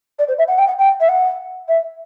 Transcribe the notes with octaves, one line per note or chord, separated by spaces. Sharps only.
D5
C5
E5
F#5
G5
F#5
G5
E5
F#5
E5